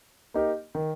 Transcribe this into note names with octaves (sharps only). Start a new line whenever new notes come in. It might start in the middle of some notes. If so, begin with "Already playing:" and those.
A#3 D#4 G4 A#4
D#3